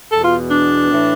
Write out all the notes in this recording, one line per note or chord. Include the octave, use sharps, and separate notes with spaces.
E2 B2 A4
F4
D4
A2 E3